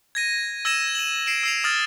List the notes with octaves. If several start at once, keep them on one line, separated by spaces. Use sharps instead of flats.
G#6 A#6 D#7
E6 G#6 A#6 D#7 E7
D#7 F#7
C7 D7 E7
E6 C7 F7
D#6 F6 A6